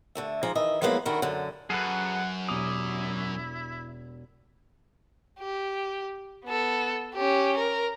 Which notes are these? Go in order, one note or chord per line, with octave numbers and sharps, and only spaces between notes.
D3 A3 E5
G#2 F3 G#5 A#5
D#3 E3 D#5 E5
F3 F#3 G#3 A#3 B3 E4
D3 D#3 E4 F#4 A#4
F#2 D3
F#2 G#4 A4 B4 F#5 F6
E1 E4 G4 D6 D#6 F7
G4
B3 A4
C#4 G4
A#4